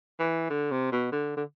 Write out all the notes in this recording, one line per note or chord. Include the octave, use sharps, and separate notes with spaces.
E3
D3
C3
B2
D3
D3